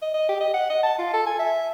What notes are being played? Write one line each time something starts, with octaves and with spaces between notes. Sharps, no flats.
D#5
D#5
G4
D#5
F#5
D#5
A5
F4
A4
G#5
E5